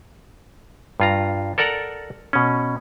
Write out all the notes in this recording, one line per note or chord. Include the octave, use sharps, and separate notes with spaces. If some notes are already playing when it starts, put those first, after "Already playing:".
G2 F4 A#5
A4 A#4 D5 F#5 A#5
B2 C#4